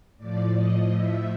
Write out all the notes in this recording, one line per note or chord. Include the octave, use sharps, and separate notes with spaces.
A2 F3 D5
D#5
E5